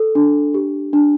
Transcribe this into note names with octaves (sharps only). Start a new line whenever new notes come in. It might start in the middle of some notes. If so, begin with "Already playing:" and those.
Already playing: A4
D4
G4
D4